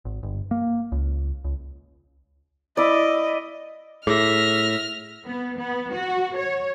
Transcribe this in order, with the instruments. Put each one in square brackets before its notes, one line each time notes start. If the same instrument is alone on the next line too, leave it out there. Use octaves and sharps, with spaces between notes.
[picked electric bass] G#1
G1
A#3
C#2
C#2
[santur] E4 D5 [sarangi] D#5
[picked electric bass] A2 [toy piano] G#4 [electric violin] E5 A#6 [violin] F6
[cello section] B3
B3
F#4
C#5